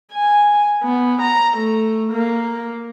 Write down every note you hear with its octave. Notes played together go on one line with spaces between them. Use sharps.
G#5
B3
A#5
A3
A#3